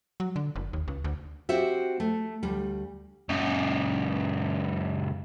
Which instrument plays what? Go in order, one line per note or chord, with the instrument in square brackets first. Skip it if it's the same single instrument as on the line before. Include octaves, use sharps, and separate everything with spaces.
[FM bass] F#3
D3
F#1
D#2
C#2
D2
[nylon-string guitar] C4 F#4 G4 C5 E5
A3
D2 G3
[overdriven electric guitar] C#2 F#2